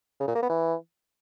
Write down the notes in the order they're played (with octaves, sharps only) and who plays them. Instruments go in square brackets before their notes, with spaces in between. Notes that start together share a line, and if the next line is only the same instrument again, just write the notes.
[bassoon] C#3
A#2
A#3
B3
E3